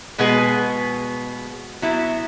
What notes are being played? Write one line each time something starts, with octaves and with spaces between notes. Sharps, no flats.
B2 G#3 B3 G#4 B4
F#3 B3 E4